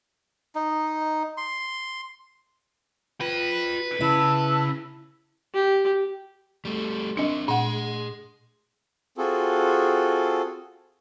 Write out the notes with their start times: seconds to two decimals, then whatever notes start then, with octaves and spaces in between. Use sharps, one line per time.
0.55 D#4
1.37 C6
3.21 F4 B4 G5
4.01 C#3 C#4 E4 A5 E6
5.54 G4
6.65 G3 A3
7.17 C4 D4 A#4 D#5
7.48 A#2 G#4 F#5 C6
9.18 C4 F4 F#4 G#4 A4